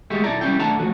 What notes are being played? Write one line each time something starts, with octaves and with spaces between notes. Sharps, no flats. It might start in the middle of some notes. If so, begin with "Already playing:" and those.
G#3 A3 F#4 G4
B1 E4 A4 D5 A#5
C2 E3 G3 C#4 E4 G5
B1 A3 D4 F#5 A5 A#5
F3 A3 F#4